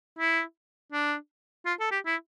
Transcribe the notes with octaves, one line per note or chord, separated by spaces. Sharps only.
E4
D4
F4
A4
G4
E4